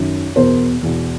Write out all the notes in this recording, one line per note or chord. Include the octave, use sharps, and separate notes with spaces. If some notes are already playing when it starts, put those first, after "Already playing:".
Already playing: F#2 D#3
E2 B2 A#4 C5
E2 B2